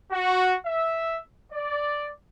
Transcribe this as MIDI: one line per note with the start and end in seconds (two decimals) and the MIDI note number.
0.12 0.56 66
0.66 1.18 76
1.53 2.10 74